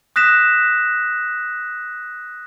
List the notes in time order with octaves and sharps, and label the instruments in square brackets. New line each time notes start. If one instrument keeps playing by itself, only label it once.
[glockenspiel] D#6 F#6 A#6 B6 E7